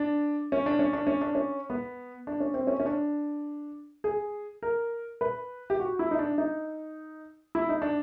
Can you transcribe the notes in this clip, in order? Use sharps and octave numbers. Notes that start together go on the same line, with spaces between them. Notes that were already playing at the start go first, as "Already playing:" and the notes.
Already playing: D4
C#4
D4
C#4
D4
C#4
D4
C#4
B3
D4
C#4
C4
C#4
C#4
D4
G#4
A#4
B4
G4
F#4
E4
D#4
D4
D#4
E4
D#4
D4